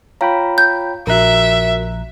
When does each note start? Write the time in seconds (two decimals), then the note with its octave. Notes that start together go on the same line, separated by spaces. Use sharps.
0.21 F4 C#5 F5 G5 A#5 B5
0.58 G6
1.07 A#1 F#4 A#4 E5 A#5 F#6